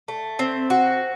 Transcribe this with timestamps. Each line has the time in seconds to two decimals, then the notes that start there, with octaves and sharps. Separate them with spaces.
0.08 A3
0.39 C4
0.70 F#4